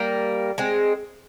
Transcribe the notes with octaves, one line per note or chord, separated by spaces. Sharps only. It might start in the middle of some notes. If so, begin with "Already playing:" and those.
Already playing: G3 A#3
G#3 C4